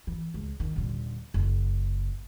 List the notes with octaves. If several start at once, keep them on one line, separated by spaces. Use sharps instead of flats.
E3
C#2
D#3
D#1 D3
F#1